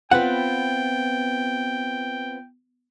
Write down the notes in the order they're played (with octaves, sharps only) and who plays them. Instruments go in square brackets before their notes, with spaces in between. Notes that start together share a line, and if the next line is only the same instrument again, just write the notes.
[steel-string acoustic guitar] B3 C4 F4 [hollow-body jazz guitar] B4 F#5 [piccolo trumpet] G5